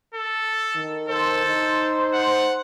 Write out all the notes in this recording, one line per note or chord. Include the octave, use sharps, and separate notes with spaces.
A4
D#3
A4 C5
D#4
F#5